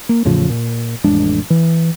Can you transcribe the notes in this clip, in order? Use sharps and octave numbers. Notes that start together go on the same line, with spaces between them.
A#3
E2 A2 C#3 F3
A#2
A1 F2 G#3 D4
E3